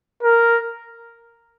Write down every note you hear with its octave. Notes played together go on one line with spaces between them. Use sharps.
A#4